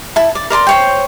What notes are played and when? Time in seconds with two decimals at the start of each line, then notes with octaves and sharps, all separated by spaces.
0.16 E4 A5
0.35 D5
0.50 A#4 D5 B5 C6
0.67 C5 C#5 G5